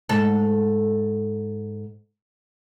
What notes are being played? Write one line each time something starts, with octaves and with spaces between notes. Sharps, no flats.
G#2 A4